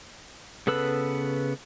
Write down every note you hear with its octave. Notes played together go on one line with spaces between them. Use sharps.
C#3 B3 A4 B4 E6